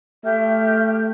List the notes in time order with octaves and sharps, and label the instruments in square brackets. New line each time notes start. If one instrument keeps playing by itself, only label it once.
[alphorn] A3 [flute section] G4 F6 G6 [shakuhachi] E5